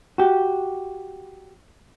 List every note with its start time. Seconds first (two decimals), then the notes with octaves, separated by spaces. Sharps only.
0.18 F#4 G4